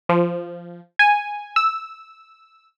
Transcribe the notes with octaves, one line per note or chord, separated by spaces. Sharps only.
F3
G#5
E6